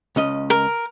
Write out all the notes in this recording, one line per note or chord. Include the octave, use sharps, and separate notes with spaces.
C#2 C#4 D#5
A#4